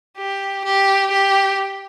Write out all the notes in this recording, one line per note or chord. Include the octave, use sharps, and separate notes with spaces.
G4
G4
G4